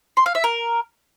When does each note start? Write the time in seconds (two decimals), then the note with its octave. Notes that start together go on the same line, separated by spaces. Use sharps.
0.17 C6
0.26 F5
0.35 E5
0.44 A#4